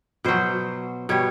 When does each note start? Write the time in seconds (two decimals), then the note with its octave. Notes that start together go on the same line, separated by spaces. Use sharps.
0.24 B2 F#3 C5
1.09 B2 G3 C#5